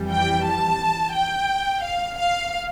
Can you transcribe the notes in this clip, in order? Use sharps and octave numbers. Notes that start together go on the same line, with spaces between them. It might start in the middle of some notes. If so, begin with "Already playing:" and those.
Already playing: F2 E3 G3
G5
A5
G5
F5
F5